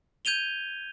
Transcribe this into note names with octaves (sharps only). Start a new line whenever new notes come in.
G6 G#6 D#7 F7 G7